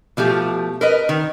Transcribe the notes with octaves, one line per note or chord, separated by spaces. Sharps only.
B2 F3 A3 G4
A#4 B4 D#5
D#3